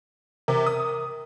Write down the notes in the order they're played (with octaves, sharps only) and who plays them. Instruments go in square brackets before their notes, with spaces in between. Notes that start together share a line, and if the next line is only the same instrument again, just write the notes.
[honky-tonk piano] C3 [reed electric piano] A#4
[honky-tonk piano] D#6